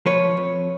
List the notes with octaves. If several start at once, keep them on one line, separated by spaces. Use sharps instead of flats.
F3 B4 C#5
F2